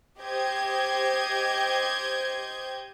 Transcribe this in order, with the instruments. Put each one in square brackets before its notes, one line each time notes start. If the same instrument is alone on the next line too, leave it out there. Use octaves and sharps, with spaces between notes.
[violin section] G4 C5 D#5 G6 G#6